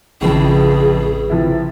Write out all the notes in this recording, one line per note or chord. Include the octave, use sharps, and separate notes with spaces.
A1 F2 A2 C#3 G#4 B4
C3 F3 E4